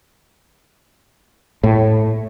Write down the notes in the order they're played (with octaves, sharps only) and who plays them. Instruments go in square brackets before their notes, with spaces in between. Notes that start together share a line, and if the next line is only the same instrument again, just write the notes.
[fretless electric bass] A2